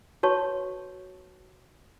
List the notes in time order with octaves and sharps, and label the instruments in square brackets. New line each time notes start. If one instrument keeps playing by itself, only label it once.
[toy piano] F#4 B4 C#5 A5 C#6